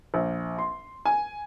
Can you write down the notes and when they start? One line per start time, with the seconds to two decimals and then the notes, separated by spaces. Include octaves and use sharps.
0.14 A#1
0.59 C6
1.05 G#5